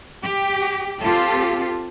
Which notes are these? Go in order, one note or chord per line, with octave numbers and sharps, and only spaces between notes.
G4
C4 F4 G4 A4